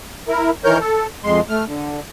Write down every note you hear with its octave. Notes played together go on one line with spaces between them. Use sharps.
E4 A#4
D#3 E3 A#4 C#5 F6 G6
A4
F2 G#3 C6
A3 F6
D3